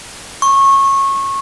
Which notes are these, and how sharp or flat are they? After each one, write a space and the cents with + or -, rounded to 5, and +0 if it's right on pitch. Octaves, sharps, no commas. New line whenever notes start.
C#6 -20